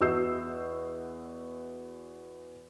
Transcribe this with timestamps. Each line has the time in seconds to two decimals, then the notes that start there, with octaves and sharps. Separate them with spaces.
0.01 E2 F#4 D#5 E6 G6 C7